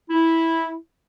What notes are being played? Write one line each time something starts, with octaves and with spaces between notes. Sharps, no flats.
E4